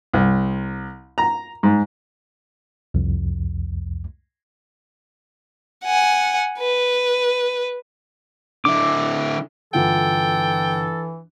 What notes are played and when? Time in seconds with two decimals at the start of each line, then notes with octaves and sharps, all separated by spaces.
0.14 C2
1.18 A#5
1.63 G#2
2.94 C2 F2
5.85 F#5 G#5
6.59 B4
8.65 D3 E4 D6
9.74 G1 E3 F4 A4 F#5 G5